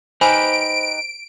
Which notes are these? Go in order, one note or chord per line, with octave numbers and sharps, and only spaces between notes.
D#4 G4 B4 C5 G#5 B5 D7